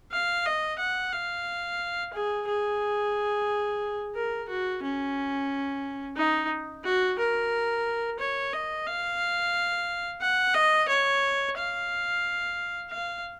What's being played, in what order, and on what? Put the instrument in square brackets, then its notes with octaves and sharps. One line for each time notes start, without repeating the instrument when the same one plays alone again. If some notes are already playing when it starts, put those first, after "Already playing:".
[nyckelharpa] F5
D#5
F#5
F5
G#4
G#4
A#4
F#4
C#4
D#4
F#4
A#4
C#5
D#5
F5
F#5
D#5
C#5
F5
F5